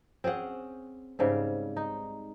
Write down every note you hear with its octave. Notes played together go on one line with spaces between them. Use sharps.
C4 C#4 G#4 F#5
G#2 C#3 G3 C4
D#4